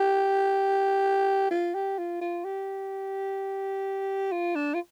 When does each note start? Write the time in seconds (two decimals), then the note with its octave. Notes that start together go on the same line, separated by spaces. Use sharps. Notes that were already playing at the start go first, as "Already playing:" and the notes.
Already playing: G4
1.51 F4
1.75 G4
1.98 F4
2.21 F4
2.45 G4
4.32 F4
4.56 D4
4.75 F4